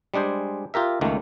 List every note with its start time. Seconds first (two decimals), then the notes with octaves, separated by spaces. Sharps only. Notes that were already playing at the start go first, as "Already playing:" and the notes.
0.14 G3 G#3 D4 G#4 C5
0.74 F4 G4 A#4 E5
1.01 C#2 D#3 A3 A#3